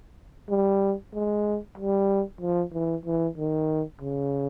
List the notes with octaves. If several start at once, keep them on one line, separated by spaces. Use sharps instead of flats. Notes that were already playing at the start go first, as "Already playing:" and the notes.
G3
G#3
G3
F3
E3
E3
D#3
C#3